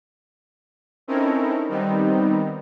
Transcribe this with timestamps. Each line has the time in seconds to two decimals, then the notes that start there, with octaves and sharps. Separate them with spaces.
1.08 C4 C#4 D#4 E4 A4 A#4
1.69 D#3 G3 B3 C4 D#4